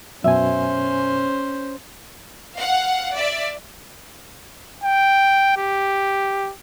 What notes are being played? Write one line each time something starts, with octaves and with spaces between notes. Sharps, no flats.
F#2 B2 C#4 C5 E5 G#5
F5 F#5
D5 E5
G5
G4